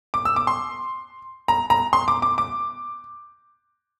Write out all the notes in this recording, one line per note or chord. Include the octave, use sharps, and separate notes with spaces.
D6
E6
D6
C6
A#5
A#5
C6
D6
D6
D6